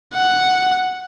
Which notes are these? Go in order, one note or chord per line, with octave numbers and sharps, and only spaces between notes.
F#5